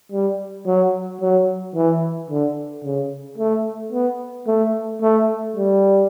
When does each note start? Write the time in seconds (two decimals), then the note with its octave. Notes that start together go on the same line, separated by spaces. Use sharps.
0.12 G3
0.66 F#3
1.21 F#3
1.76 E3
2.30 D3
2.84 C#3
3.38 A3
3.93 B3
4.47 A3
5.02 A3
5.56 G3